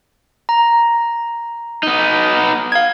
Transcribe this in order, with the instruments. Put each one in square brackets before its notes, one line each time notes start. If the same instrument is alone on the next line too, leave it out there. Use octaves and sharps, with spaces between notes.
[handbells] A#5
[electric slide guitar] B3 D#4
[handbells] F5 G#6